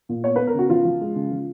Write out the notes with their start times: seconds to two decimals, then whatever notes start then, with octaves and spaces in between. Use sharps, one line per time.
0.09 A#2
0.24 B3 C#5
0.36 B4
0.39 B3
0.47 A#4
0.54 C#3 F#4
0.70 F3 F4
0.85 F3
1.01 G#3
1.16 C#3
1.31 F3